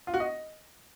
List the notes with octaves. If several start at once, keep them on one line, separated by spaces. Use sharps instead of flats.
F4
F#4
D#5